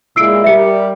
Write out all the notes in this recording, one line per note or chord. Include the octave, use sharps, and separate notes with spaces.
A#2 G#3 E4 E6 C7 D7
G3 A#4 E5 C#7